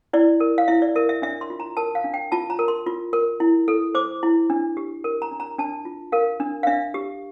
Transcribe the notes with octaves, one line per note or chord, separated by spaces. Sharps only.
E4 D5
A#4
F5
E4 E5
D5
A#4 E5
E5
D4 E5
C6
F4
A#5
A#4 A5
F5
D4
G5
F4 A5
A#5
A#4
C6
F4
A#4
E4
A4
C5 D6
E4
D4
G4
A#4
A#5
D4
A#5
D4 A5
F4
A#4 F5
D4
F5
D4 E5
G4